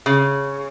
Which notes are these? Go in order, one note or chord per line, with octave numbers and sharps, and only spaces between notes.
C#3